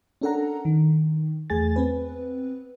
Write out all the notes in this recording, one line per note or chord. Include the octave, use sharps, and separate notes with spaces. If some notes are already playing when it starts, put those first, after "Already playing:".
C#4 D4 A4 A#4 F#5 A#5
D#3
E2 A3 G#4 G#5 A6
B3 C4 B4